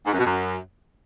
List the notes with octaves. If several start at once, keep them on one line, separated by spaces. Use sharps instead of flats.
G#2
F#2
B2
F#2